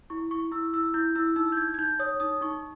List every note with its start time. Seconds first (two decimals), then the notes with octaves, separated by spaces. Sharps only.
0.10 E4 C#6
0.31 E4 C#6
0.52 E4 E6
0.73 E4 E6
0.94 E4 G6
1.15 E4 E6
1.36 D#4 E6
1.52 G6
1.57 D#4 G#6
1.74 G#6
1.78 D#4 G6
1.99 C#5 D#6
2.20 D#4 D#6
2.41 D#4 C#6